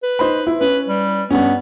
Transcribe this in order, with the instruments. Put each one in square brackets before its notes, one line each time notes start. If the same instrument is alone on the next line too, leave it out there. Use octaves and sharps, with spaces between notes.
[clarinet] B4
[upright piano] D#4 C5 B5
E4
[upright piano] C#4 [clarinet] B4
[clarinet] G3
[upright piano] G2 C#4 [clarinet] B3